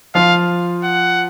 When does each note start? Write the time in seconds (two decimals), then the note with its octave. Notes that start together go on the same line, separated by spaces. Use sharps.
0.15 F3 F4 F5
0.84 F#5